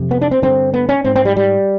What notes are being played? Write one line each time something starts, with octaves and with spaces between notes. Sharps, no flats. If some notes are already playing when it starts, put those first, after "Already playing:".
Already playing: F2 C3
B3
D4
C4
G2 D3 C4
B3
C#4
G#2 C4
C4
G3
G3